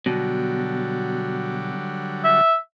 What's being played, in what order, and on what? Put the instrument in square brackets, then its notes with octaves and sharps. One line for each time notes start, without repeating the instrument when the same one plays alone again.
[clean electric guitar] B2 [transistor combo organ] D3 F#3 G3
[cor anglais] E5